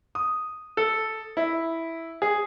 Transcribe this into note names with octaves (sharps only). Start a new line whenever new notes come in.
D#6
A4
E4
G#4